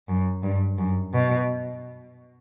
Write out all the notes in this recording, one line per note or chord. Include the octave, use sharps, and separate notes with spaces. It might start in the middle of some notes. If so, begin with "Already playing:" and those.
F#2
G2
F#2
B2